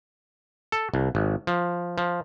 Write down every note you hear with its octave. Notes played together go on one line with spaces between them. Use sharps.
A4
C2
G#1
F3
F3